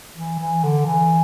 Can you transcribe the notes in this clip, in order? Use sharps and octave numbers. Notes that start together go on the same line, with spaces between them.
E3
E3
D3
E3